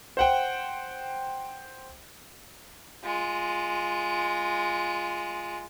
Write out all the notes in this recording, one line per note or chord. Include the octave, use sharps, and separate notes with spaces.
C5 F#5 G5
G#3 F4